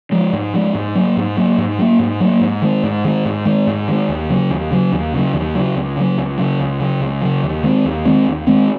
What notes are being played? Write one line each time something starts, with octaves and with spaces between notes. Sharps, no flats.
F3 G#3
G#2
F3 G#3
G#2
F#3 A#3
G#2
F#3 A#3
G#2
F#3 A#3
G#2
F#3 A#3
G#2
D#3 G#3
G#2
D#3 G#3
G#2
D#3 G#3
G#2
D#3 G#3
D#2
C#3 F#3
D#2
C#3 F#3
D#2
C#3 F#3
D#2
C#3 F#3
C#2
C#3 F#3
C#2
C#3 F#3
C#2
C#3 F#3
C#2
C#3 F#3
D#2
D#3 G#3 C4
D#2
D#3 G#3 C4
D#2
D#3 G#3 C4